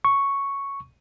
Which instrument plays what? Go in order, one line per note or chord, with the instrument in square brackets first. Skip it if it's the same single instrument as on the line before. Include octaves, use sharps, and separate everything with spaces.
[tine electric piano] C#6